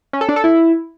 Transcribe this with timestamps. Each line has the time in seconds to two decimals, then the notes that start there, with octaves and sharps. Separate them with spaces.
0.13 C#4
0.21 A4
0.29 D4
0.36 A4
0.44 E4